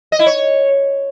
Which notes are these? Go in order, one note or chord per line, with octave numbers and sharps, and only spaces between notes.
D#5
E4
C#5